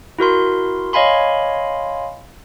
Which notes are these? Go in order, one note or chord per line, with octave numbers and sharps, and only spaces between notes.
E4 F#4 A#4 C6
C#5 D#5 F5 G#5 B5 C6